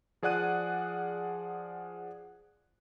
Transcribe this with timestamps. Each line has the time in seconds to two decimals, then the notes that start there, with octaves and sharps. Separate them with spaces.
0.22 F3 G#4 D5 F#5 F#6 D#7